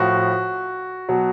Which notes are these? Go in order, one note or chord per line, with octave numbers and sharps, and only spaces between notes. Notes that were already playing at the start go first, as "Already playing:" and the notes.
Already playing: A2 F3 F#4
B2 F#3